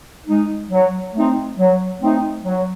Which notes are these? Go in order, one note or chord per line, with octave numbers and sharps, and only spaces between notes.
G#3 D#4
F#3
A3 C4 D#4
F#3
A3 C4 D#4
F#3